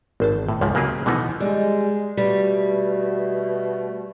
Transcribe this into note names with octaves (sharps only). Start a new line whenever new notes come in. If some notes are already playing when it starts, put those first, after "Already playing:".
G#1 C5 A5
A2
C#2 G#2 F3
C#3 F#3 A#3 G4 G#4
B2 D3 E3 F3 B3 D#4
G3 G#3
B2 G3 A3